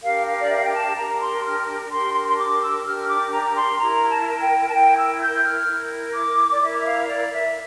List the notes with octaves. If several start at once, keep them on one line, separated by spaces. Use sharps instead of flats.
D4 G4 A#4 F5
F5
D5
E5
F5
G5
A5
D4 G4 A#4 A#5
C6
F6
D4 G4 A#4 C6
C6
C6
D6
E6
D4 G4 A#4 F6
D6
A#5
C6
E4 A#4 A#5
A5
G5
A5
E4 A#4 G5
E6
G6
F6
E4 A#4
D6
D5
E4 A#4 E5
F5
D5
E5